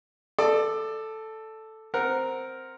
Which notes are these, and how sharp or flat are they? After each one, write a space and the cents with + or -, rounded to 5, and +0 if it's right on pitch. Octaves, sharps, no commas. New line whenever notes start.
A4 +0 D5 +25
C4 +0 A#4 +0 F#5 +0